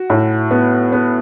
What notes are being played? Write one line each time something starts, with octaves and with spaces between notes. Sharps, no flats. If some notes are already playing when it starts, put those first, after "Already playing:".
Already playing: F#4
A2
B3
B3